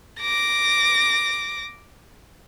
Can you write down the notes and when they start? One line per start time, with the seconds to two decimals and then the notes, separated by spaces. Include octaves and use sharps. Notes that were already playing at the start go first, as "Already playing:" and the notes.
0.21 D6 A#6